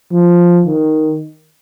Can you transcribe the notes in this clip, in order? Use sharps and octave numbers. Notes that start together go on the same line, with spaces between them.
F3
D#3